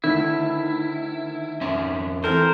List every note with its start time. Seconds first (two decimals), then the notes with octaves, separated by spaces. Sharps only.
0.04 D2 D#3 E4
1.61 F2 C#4 E5
2.24 E3 C4 A4 A#4 C5